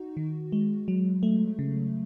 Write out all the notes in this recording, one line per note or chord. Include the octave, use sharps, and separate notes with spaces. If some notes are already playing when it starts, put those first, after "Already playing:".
Already playing: D#4 F#4
D#3
G#3
F#3
A3
C#3